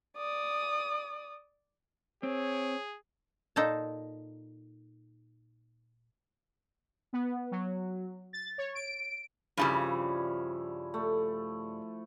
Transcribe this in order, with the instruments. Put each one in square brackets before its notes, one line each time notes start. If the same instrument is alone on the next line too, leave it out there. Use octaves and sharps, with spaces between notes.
[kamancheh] D5 D#6
[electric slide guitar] C4 [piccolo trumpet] G#4 [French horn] C#5
[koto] A#2 D#4 A4 C5 A5
[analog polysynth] B3
F#3
A6
C#5
D7
[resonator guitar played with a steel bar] G2 C#3 G3 [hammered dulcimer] F3 E4
[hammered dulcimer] A3